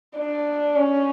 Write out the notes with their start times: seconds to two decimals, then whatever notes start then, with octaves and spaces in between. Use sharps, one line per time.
0.18 D4
0.76 C#4